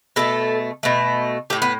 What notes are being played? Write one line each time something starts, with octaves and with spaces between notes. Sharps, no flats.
B2 A3 A4
B2 A3
A2 A3 G4
B3